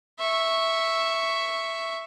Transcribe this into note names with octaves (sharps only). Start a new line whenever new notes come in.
E5 C#6